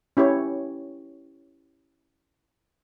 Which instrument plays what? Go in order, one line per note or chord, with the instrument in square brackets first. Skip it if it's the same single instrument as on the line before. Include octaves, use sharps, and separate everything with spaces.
[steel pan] C#4 E4 G4 C#5